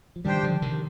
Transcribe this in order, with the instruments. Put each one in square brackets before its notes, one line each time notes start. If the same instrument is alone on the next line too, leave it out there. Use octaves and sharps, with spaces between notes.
[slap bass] F3
[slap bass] D#3 G3 [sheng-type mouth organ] D4 G4 C5 G5
[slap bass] D3 F3
C3 D#3